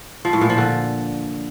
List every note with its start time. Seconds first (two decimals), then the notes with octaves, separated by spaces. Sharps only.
0.25 F3
0.33 A2
0.41 A#2
0.50 F3
0.58 D3